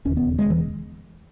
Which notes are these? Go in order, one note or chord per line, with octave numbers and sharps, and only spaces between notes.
E1 D#2 C#3 C#4
B3
G#3
E3